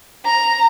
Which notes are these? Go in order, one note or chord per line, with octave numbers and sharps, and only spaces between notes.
A#5